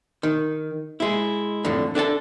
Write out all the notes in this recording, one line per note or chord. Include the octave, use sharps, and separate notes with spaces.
D#3
G#3 E4
F2 A2 D3
D4 A4 G#5 A5